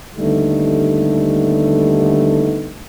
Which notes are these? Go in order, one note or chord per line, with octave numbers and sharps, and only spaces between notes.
D#2 D3 G3 A3 B3 D#4